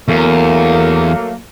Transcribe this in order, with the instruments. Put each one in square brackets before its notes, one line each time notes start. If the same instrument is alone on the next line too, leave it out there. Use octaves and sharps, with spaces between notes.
[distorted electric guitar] E2 [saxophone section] F#3 A3 A#3